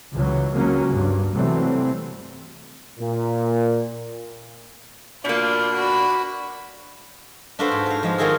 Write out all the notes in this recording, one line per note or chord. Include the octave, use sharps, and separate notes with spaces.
C#2 E3 F#3
C#2 F#3 A#3 C#4
G2
C3 E3 F#3 G3 A3 C4
A#2
B2 A#3 D4 F4
F#4 B5
D4 F4 F#4 A4 B4 C5
G#2
F#4 F5
F3 G#3
D#3 F#3 F4 F#4 G#4 A4